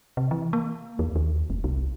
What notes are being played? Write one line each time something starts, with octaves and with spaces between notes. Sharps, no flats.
C3
E3
A#3
E2
D#2
F#1
C2